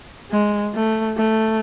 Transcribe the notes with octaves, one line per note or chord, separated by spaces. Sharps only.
G#3
A3
A3